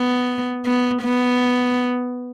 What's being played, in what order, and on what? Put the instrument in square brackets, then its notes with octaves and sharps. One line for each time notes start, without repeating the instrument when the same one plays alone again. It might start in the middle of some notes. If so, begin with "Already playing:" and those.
Already playing: [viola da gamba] B3
B3
B3